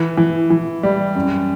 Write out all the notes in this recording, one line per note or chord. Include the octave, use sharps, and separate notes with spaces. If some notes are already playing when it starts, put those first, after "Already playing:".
Already playing: E3
E3
E3
G3
F#2